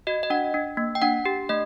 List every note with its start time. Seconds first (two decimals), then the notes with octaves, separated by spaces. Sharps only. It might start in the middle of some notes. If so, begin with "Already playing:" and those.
0.07 F#4 D#5
0.23 D#5
0.30 D4 F#5
0.54 D4
0.77 A#3
0.95 G5
1.02 D4 F#5
1.25 G4
1.49 A3 D#5